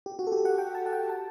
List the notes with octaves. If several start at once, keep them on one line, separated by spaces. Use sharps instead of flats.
G4
F#4
A4
G4
F#5
G5
A5
F#5
G5
A5